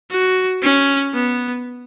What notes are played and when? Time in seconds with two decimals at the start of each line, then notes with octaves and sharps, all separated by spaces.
0.10 F#4
0.62 C#4
1.14 B3